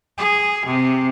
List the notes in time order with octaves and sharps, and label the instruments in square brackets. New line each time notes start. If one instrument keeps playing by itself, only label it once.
[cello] G#4
C3